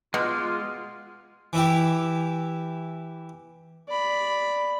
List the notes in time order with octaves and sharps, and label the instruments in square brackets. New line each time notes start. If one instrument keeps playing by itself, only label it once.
[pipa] B2 [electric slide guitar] G#3 [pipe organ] F4 [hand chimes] F#4 D6 F6
[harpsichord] E3 E4 G4
[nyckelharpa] D5 B5